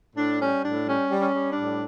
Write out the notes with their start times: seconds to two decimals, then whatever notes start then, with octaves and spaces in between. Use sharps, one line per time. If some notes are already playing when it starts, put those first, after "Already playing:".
0.16 A2 D4
0.39 G3 C#4
0.63 A2 D4
0.86 G3 C#4
1.10 G3
1.18 C#4
1.33 G3
1.49 D4
1.56 A2